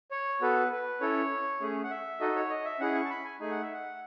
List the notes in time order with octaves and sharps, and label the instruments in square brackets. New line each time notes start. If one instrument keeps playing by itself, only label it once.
[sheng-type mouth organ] C#5
B3 F#4 A4 B4
B4
C#4 E4 A4 C#5
A3 C#4 G#4
F#5
E5
D#4 F#4 A4 D#5
C#5
D#5
E5
C#4 E4 G#4 F#5
C#6
A5
B5
G#5
A3 D#4 G#4 G#5
F#5
E5
F#5